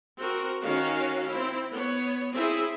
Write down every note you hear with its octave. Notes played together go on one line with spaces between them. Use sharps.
C4 F#4 A#4
D#3 C#4 F#4 F5
C4 E4
B3 C#5
C4 E4 G#4 E5